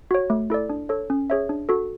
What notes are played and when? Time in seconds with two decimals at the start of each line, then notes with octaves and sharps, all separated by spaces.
0.11 F#4 C#5
0.30 A3
0.50 E4 A4 D5
0.70 D4
0.89 A4 C#5
1.10 C#4
1.30 G#4 C#5 E5
1.49 D4
1.69 F#4 A4